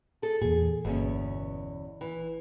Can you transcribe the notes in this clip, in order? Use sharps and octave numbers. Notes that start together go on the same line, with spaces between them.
G#4 A4
E2 A#2 G#4
G1 E2 B2 A#3 C#4
E3